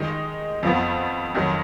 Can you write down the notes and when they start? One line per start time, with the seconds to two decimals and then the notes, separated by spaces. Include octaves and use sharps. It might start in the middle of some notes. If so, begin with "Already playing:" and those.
Already playing: D#3 G#3 D#4
0.63 F2 F3 B3
1.35 F2 D#3 F#3